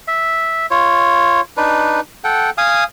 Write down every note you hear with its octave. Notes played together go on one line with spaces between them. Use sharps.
E5
F4 C#5
D4 D#4 B4
A4 F#5 G5
F5 G#5 D#6